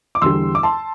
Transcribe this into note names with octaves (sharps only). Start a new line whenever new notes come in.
D6
E2 D3 G3 C6 E6
D6
A5 C6